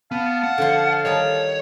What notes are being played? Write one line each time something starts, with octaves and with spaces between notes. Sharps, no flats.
B3 F5 A5
F#5
D3 F3 F4
D#3 G3 D#4 C#5